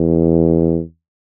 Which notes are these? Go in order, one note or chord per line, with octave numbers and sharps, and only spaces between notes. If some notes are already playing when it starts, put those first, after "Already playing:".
Already playing: E2